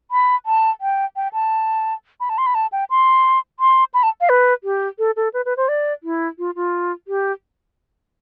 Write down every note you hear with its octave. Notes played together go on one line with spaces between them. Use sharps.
B5
A5
G5
G5
A5
B5
A5
C6
B5
A5
G5
C6
C6
B5
A5
F5
B4
G4
A4
A4
B4
B4
C5
D5
E4
F4
F4
G4